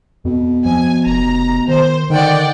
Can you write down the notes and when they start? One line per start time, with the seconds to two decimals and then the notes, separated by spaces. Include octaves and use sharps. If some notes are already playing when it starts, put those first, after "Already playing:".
0.25 F2 B2
0.66 F3 G#5
1.06 F1 A#5
1.68 D#3 C5
2.10 D3 D#3 D5 F#5 G5